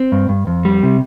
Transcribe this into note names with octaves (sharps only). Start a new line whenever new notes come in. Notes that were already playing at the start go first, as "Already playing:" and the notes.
Already playing: C4
G2
G2
F2
G3
C3